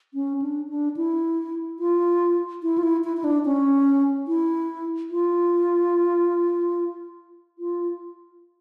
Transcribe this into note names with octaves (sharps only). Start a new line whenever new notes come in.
C#4
D4
D4
E4
F4
E4
F4
E4
E4
E4
D4
C#4
E4
F4
F4